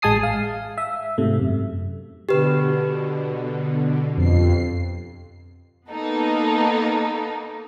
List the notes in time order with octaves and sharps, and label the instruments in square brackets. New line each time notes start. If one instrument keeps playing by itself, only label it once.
[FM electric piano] A1 G#3 G#5 A5 D#6 C7
F5
E5
G#2 C3 A3
F#2
[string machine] B2 D3 [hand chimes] G4 B4
[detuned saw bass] F2 [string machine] C7
[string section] A#3 B3 D#4 A4